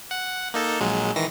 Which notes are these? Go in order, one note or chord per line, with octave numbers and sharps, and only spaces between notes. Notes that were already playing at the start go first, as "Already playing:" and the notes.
F#5
A#3 D#4 A4
A#1 F#3 G#3
D#3 E3 A#6